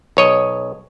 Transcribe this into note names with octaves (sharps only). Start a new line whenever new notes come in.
B1 C#5 D#5